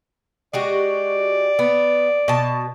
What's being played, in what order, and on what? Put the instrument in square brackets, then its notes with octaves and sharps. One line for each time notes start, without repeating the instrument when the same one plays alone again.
[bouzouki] G#3 F#4 G4 [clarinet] D5
[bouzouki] B3
B2 A5